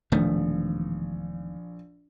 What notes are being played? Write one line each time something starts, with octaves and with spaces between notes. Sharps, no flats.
E1 A#1 D#3 F3 A3